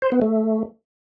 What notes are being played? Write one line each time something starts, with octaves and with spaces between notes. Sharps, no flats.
C5
B3
A3